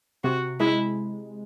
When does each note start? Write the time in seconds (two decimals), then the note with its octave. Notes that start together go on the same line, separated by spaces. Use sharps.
0.24 C3 F#4
0.60 G#3 E4